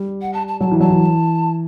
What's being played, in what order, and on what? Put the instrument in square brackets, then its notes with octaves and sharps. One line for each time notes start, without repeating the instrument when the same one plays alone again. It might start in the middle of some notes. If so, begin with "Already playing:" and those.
Already playing: [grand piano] G3
[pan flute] F#5
A5
A5
[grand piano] F#3 [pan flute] A5
[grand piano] E3
[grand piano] F#3 [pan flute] A5
[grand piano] E3